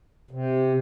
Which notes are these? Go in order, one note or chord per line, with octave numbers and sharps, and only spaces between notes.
C3